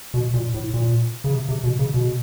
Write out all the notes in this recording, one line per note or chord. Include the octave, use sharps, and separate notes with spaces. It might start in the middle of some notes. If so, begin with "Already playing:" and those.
B2
A#2
A2
A#2
C#3
C3
C3
B2
C#3
B2